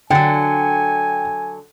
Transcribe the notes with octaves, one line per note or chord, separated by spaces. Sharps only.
D3 F#3 G5 G#5